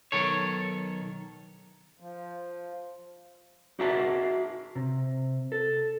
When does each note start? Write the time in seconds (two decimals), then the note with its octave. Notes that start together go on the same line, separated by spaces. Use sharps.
0.12 B1 D#3 A4 C#5
2.00 F3
3.79 D#4 F#4 G#4 E5 A5
4.75 C3
5.52 A4